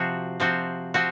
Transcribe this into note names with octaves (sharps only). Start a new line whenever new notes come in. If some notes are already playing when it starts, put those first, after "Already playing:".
Already playing: C3 F3 C4 F#4
C3 F3 C4 F#4
F3 C4 F#4